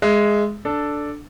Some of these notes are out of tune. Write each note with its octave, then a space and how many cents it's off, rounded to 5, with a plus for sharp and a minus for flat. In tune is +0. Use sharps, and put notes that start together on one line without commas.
G#3 +0 E5 +20
D4 +0 A4 +0